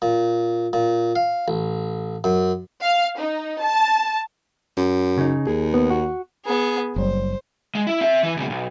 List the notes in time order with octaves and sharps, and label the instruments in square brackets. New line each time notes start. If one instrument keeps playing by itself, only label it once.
[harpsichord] A#2
A#2
F5
A1
F#2
[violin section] F5
D#4
A5
[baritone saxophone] F#2
[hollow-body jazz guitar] C#3 D#4
[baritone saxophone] D#2 [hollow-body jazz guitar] G#4
[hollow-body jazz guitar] B3
F#4
[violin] B3 G#4
[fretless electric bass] F#1 F#3 G3 [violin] C5
[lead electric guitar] G#3
E4
C4 E5
E3
C#2 B2
B1